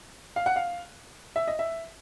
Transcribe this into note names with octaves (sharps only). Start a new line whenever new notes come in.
F5
F#5
F5
E5
D#5
E5